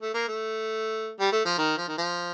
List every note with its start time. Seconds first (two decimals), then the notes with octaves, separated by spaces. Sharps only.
0.02 A3
0.14 A#3
0.27 A3
1.19 G3
1.32 A3
1.45 F3
1.58 D#3
1.77 F3
1.88 D#3
1.98 F3